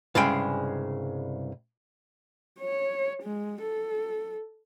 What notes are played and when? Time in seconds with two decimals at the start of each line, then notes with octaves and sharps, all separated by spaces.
0.15 C2 G2 C#3 G#3 G5
2.61 C#5
3.22 G#3
3.61 A4